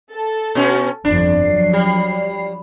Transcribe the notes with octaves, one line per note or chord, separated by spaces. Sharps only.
A4
B2 C#4
G1 F2 D4
F3 F#3 C7
G3